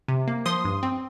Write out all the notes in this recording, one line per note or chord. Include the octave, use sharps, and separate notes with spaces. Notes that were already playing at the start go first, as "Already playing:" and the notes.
C3
A#3
F3 C6 D#6
G2
C4